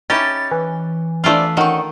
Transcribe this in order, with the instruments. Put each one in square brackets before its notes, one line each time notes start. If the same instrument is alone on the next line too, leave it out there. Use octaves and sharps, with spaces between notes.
[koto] C#4 G4 [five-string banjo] D#4 E4 [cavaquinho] C#5 B5 [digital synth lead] A6
[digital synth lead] E3
[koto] A3 D4 F4 [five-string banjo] C4 E4 D5
[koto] D#3 [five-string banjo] C#4 D#4 [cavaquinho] F#4 C#6